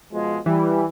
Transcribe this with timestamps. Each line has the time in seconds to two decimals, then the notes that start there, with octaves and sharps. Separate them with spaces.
0.13 B2 F3 G#3
0.46 E3 G3